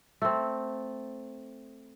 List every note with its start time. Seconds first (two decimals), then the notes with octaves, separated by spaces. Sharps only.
0.22 A3 C4